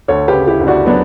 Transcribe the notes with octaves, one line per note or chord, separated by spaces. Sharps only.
D2 A4 C#5
G4 B4
C#3
E4 G4
D2
D4 F#4
F#3 B3 D4